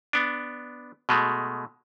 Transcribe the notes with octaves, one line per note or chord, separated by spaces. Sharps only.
B3 D4
B2 G#3 A3